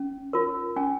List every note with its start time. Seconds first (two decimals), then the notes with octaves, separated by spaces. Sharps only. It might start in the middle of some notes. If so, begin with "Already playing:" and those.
Already playing: C#4
0.33 F4 A#4
0.76 C#4 G#5